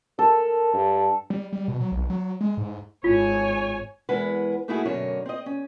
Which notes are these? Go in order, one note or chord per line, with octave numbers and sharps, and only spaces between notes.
A4 A#4
G2
G3
G3
B2
F#3
B1
F#3
G#3
G#2
G#1 F4 C#5 G#5
E2 G#3 E4 A#4 B4 F#5
A3 A#3 D#4 E4 F#4 G#4
F#2 B2 D3 A#4 C#5
C4 D#5
C#4